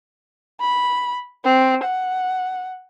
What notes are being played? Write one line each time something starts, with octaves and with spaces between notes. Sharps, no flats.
B5
C4
F#5